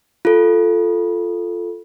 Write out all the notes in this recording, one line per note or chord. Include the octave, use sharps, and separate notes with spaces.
F4 A4